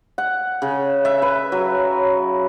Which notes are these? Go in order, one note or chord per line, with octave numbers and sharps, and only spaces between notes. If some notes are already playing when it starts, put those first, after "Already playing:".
F#5
C#3
E5
B4
F#3